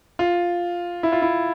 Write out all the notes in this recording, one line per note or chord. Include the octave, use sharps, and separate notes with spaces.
F4
E4
F4
E4